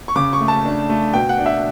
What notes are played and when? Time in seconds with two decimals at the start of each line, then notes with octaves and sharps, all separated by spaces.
0.08 C#6
0.16 C#3 D6
0.33 C#6
0.40 A3
0.48 A5
0.65 D4
0.89 A3
1.14 B2 G5
1.29 F#5
1.38 D4
1.46 E5